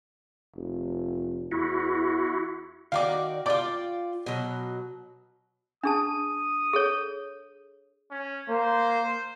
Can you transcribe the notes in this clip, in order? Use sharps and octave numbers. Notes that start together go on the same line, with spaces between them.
F1
E2 E4 F#4
D#3 F#4 D5 F5 D6
F4 D5 G5 D6
B2 F#3
D4 G#4 A5 D#6
G#4 A4 C#5
C#4
A#3 C5